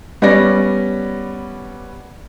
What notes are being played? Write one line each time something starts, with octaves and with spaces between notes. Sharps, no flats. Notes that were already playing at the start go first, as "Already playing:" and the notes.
G3 B3 C#4 D5 A#6